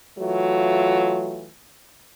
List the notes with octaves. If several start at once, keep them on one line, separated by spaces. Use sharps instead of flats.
E3 F#3 A3 F4